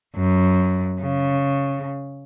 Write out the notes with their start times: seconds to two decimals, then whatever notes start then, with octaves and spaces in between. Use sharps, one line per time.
0.16 F#2
1.01 C#3